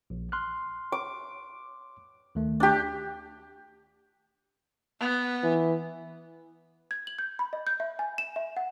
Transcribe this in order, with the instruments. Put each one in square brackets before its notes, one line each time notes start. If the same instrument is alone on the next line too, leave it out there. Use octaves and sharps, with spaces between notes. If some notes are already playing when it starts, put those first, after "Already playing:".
[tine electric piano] A#1
C6 F6 F#6
[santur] D6
[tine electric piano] D2 D#3 A3
[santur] D4 G4
[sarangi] B3
[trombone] E3
[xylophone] G#6
F#7
G6
B5
D#5
G6
E5
G#5
E7
E5
F#5